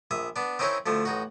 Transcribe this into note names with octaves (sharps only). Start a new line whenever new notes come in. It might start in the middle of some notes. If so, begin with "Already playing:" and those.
A#1 E5 D#6
B3 D4
C4 C#4 D#4 E4 A#4 C#5
D2 F3 A3
A1 D#4 F#4